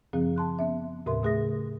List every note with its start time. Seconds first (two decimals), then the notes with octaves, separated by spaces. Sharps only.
0.13 F#2 C#3 F3 C4 G#4 F5
0.36 A5 C6 F#6
0.59 B3 C#4 E5
1.06 D#2 A2 C#3 A#4 E5 C6
1.23 C#3 A3 G#4 E5 D#6 A#6